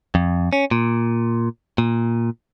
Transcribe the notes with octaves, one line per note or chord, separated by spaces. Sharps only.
F2
C#4
A#2
A#2